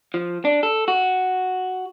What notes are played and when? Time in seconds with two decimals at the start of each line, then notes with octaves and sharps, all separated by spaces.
0.14 F3
0.45 D4
0.63 A4
0.88 F#4